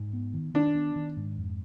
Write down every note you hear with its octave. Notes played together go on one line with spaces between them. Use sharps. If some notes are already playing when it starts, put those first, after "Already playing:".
Already playing: G#2
B3
D#3
D#3 D4
B3
D#3
G#2
F2